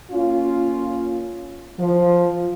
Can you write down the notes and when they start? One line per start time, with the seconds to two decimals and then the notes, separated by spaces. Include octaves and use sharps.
0.12 A#3 C#4 F4
1.80 F3